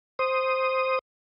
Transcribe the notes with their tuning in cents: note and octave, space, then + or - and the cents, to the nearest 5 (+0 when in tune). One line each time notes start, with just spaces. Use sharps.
C5 +0 D#6 +0